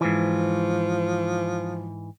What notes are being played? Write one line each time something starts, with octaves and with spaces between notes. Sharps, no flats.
G#2 E3 F3